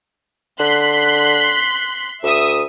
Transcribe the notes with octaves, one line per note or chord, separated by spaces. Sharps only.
D3 C6 F#6 B6
D2 E5 D#6